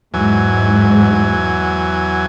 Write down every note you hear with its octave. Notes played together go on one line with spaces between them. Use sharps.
E2 G#2 F#3 G#5